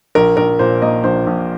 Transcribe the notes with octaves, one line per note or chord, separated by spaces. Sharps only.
A#1 A#4
A#1 A#4
A#2 C5
A#3 D#5
A#1 C5
A#1